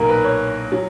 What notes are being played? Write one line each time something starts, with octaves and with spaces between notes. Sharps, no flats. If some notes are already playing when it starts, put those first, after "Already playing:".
Already playing: B1 A#2 A#3 A#4
B4
C#5
F#3